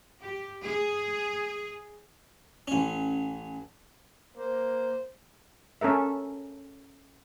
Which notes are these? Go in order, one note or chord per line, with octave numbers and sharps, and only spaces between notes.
G4
G#4
A1 C#4
A#3 C5
C#4 A4 A#4 E5